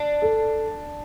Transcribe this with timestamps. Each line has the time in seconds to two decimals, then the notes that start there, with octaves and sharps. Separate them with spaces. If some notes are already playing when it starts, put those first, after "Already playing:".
Already playing: D4
0.22 A4